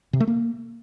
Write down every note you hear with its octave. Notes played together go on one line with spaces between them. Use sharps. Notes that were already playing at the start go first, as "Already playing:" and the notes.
C3
A3
A#3